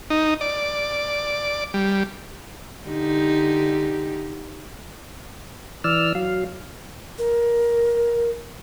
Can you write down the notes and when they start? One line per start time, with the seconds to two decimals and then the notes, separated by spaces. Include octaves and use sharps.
0.10 D#4
0.41 D5
1.74 G3
2.85 D3 D#4 G4
5.84 E3 D5 E6 F6
6.15 F#3 F5
7.18 A#4